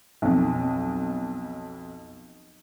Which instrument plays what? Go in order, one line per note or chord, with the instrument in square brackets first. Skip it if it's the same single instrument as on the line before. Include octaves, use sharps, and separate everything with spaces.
[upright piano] B1 F2